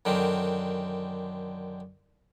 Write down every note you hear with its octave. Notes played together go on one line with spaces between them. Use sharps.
F#2 D3 D#3 C4